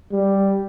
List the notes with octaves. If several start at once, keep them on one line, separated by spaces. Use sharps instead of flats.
G3